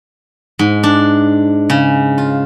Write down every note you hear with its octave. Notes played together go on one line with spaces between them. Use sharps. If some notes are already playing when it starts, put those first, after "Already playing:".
G#2
D4
C#3
F4